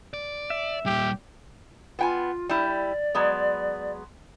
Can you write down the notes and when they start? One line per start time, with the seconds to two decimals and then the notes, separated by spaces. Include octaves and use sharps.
0.14 D5
0.50 E5
0.86 A#2 G3 G4
1.99 B3 F4 G5 G#5
2.49 G3 E4
2.66 D5
3.15 F#3 G#3 B3